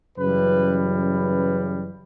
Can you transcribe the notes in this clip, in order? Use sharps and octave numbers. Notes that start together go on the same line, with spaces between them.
F#2 C#3 E3 G3 B4
B4